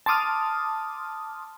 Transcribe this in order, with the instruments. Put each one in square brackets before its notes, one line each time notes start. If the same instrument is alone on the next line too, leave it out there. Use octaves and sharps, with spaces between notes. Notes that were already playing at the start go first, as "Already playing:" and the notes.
[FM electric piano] A5 C6 D6 D#6 F6